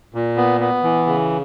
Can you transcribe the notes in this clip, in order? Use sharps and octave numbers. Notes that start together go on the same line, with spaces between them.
A#2
B3
B3
E3
C#3